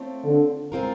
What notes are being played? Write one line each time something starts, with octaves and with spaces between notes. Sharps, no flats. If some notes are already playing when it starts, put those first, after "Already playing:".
Already playing: A3 C4 F4 A4 C#5
D3
G#3 C4 F4 A#4